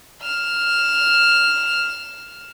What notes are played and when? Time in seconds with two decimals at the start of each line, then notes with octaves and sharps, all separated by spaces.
0.22 F6 E7